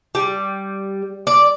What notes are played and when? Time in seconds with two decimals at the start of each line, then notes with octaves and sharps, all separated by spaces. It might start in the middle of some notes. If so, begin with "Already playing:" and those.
0.15 G3
1.27 D5